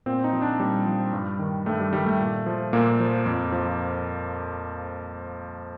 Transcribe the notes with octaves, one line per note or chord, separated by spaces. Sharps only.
A#2 C4
D#4
F3
D4
A#2 G3
F3
G2
D#3
G2 A3
G3
D#3 G3
A3
A#2
F3
A#2 A#3
F3
F2
F3